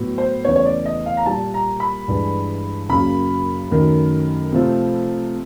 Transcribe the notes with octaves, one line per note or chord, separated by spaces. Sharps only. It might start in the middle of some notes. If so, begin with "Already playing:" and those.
Already playing: A2 F#3 B3
C5
E2 C#3 E3 A3 C#5
C#5
D5
D#5
F5
A#5
A#2 G3 A#3 A5
A#5
B5
G2 E3 G#3
F#2 C#3 F#3 A#3 B5
F#2 D#3 F#3 A3
C3 F3 A3 C4